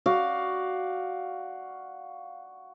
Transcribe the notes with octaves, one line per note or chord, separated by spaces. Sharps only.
F#4 D5 F5